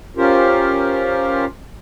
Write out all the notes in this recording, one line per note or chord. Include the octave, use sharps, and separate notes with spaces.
C#4 F4 G4 A#4 C5